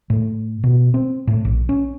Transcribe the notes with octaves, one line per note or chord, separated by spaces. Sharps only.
A2
B2
C4
A2
A#1
C#4